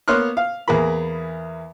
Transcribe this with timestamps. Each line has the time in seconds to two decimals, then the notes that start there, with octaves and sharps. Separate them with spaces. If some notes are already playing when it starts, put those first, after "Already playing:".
0.08 A#3 B3 C#5 C6 F6 F#6
0.37 F5
0.68 E2 A#3 G#4 A#4 B5